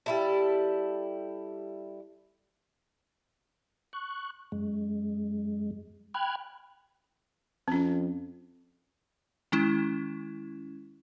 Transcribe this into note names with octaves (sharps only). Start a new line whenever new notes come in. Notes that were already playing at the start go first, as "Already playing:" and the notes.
G3 E4 A4
C#6 F#6
F#2 G#3
G5 B5 F6 F#6 G#6
F2 C4 C#4
D#3 G#3 C#4 E4 G#6 E7